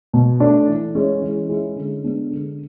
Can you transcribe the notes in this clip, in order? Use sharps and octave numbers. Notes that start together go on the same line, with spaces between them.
B2
A3 D4
E3
G#3 C#4 E4
E3
G#3 C#4 E4
D3
G#3 B3 D4
D3